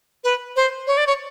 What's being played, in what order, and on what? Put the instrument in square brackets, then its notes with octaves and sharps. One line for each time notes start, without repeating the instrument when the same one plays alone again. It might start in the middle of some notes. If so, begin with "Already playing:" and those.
[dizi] B4
C5
C#5
D5
C#5